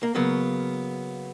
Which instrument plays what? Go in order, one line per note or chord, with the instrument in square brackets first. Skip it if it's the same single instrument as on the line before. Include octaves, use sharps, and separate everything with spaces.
[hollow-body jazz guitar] A#3
C#3 F#3 A#3 B3